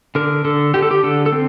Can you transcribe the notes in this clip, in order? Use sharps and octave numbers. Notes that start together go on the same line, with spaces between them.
D3 A#4
D3 A4
D3 G4
A4
G4
D3 A4
A4
C4